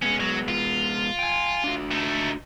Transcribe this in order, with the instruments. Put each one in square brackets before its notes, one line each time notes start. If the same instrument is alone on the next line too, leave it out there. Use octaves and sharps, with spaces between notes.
[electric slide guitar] G#3 B3 [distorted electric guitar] C#4
[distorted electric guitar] F#3
F4
[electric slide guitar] G5 G#5
D4 F#4
[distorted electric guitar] A3 D#4